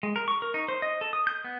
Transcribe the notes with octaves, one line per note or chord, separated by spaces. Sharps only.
G#3
A#4
C#6
A#4
D#4
C5
D#5
A4
D#6
G6
B3